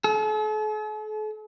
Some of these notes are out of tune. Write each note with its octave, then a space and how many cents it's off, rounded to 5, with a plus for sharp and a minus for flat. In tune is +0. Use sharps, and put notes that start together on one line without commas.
A4 -45